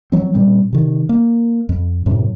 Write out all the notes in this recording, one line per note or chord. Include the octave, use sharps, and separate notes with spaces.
F3 F#3 C4
A#2 G3 C4
C3 D#3
A#3
F2
F#2 A2 C3